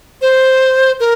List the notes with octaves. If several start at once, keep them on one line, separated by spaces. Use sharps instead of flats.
C5
A#4